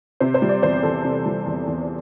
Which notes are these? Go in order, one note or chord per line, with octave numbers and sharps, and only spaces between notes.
C3 C5
C5
G3
D5
E2 C5
E2 A4
C3
G3
E2
E2